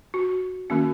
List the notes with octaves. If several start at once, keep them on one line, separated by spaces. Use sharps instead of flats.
F#4
D#3 A#3 C#4 F#4